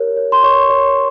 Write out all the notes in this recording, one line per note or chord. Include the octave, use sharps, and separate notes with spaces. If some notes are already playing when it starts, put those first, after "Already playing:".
Already playing: G4 A#4 C#5
C#5
C6
C#5 C#6
C#5